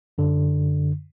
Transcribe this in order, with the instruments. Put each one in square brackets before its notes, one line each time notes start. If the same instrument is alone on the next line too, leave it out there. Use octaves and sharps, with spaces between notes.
[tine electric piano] F#2 D3